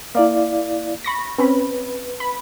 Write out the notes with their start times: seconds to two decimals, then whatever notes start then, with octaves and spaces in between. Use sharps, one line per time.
0.15 A#3 E4 D5 F5
1.04 B5 C#6 A#6
1.38 C4 C#4 B4 B5
2.20 B5